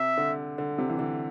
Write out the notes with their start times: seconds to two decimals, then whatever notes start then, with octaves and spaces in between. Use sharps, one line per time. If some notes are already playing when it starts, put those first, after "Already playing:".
Already playing: C3 E5
0.17 D3
0.58 D3
0.78 C3
0.90 E3
0.99 D3